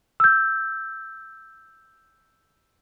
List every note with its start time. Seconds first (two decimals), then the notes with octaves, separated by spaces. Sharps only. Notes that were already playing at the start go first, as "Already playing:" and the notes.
0.20 E6 G6